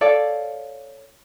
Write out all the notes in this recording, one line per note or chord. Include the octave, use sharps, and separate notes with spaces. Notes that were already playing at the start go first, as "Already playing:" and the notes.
A4 C#5 D5 F5